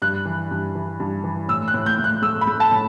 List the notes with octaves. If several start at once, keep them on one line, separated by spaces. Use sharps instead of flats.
G2 F#6
E3
G2
E3
G2
E3
A2 E6
F#6
A2
G6
A2
F#6
A3 E6
B5
A3
A5
A2